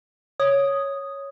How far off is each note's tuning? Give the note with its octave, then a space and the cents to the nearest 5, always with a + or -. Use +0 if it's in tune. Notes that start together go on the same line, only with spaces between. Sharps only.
C#5 +0 D#6 +0